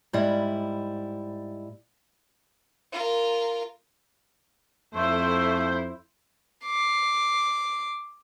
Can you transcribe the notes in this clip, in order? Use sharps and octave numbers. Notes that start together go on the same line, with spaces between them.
G#2 G3 E4
F4 A#4
F2 A3 E4 C5
D6 C7